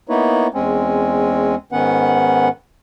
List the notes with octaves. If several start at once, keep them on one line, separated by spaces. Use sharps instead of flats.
A#3 B3 D#4 E4 B4 C#5
E2 G#3 C4 C#4
G#2 D#3 B3 C#4 B4 F#5